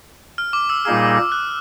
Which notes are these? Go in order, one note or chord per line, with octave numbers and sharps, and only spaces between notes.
F6
D6
E6
A#2 G3 A#3 D#4 G#4 F6
F#6